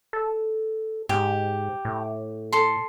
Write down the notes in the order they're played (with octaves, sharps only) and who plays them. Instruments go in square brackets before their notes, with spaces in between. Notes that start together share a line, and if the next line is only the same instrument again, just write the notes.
[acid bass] A4
[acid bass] G#2 [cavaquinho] G4
[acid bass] A2
[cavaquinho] A4 C6